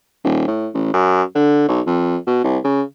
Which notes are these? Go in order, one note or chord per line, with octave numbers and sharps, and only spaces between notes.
D#1
A2
A1
F#2
D3
B1
F2
B2
C2
C#3